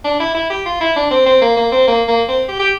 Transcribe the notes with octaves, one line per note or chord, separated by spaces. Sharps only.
D4
E4
E4
G4
F4
E4
D4
C4
C4
A#3
A#3
C4
A#3
A#3
C4
G4
G4